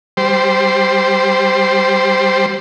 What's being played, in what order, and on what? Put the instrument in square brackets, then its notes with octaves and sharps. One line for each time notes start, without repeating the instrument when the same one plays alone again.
[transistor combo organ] G3 C5